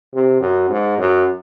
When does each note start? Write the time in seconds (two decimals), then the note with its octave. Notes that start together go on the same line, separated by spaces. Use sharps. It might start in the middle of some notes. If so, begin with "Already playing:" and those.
0.14 C3
0.41 F#2
0.70 G#2
0.98 F#2